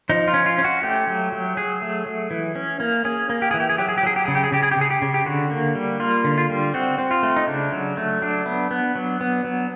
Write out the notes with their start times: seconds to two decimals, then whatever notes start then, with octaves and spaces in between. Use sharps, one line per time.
0.09 F3 D#4
0.28 F4
0.34 C#4
0.46 F4
0.58 C#4
0.64 F#4
0.83 A3 G4
1.07 F#3
1.32 F#3
1.57 F#3 G#4
1.82 A3
2.06 F#3
2.31 E3
2.55 C#4
2.80 A#3
3.05 C#4 G#4
3.30 A#3
3.42 G4
3.51 E3 G#4
3.60 G4
3.70 G#4
3.78 F#3 G4
3.89 G#4
3.98 G4
4.03 F#3 G#4
4.16 G4
4.25 C#3 G#4
4.35 G4
4.44 G#4
4.52 C#3 G4
4.63 G#4
4.71 G4
4.77 C#3 G#4
4.90 G4
5.02 C#3
5.14 G4
5.26 D3 F#4
5.51 A#3
5.75 G3
6.00 A#3 F4
6.24 D3
6.38 F4
6.50 G3
6.74 C4 F#4
6.98 C4
7.11 F4
7.23 A3
7.36 D#4
7.47 C#3 D4
7.72 F#3
7.97 A3
8.22 F#3 D4
8.46 B3
8.71 B3
8.96 F#3
9.21 B3
9.44 F#3